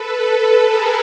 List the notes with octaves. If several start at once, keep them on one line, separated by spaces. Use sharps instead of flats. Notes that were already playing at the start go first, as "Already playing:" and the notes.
Already playing: A4 B4
A4 B4
G#4 A#4